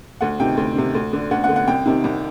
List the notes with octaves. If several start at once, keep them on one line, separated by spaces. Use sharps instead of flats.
D2 F#5
C3 D#3 G5
D2
C3 D#3
D2
D3
D2 F#5
F#5
D3
F#5
C2 G5
C3 D#3
C2